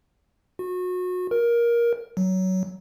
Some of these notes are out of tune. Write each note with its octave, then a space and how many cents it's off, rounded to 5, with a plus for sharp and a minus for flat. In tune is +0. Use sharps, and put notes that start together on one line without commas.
F#4 -30
A#4 +15
F#3 +15